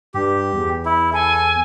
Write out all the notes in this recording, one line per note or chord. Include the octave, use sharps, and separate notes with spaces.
G2 G4
E2
E4
A4 G#5